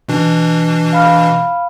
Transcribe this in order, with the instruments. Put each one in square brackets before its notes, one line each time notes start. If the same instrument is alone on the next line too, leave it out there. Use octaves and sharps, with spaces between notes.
[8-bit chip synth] B2 E3 D4
[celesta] F5 B5 F6